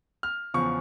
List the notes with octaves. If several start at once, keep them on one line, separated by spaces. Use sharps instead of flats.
F6
E2 C#3 F3 C#6